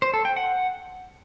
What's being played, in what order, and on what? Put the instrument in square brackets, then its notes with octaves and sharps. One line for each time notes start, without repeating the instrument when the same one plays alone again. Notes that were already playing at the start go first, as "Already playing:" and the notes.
[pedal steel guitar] C5
A4
G5
F#5